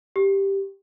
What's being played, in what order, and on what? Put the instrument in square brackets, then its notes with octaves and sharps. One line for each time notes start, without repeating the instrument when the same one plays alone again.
[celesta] G4